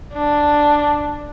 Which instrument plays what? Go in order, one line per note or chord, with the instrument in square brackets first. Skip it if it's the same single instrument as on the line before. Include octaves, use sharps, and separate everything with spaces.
[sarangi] D4